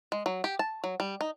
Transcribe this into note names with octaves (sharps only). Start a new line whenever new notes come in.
G#3
F#3
G4
A5
F#3
G3
D#4